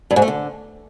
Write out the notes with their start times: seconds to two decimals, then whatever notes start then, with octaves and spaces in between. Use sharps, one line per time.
0.11 G2
0.16 G#2
0.22 A3
0.28 D3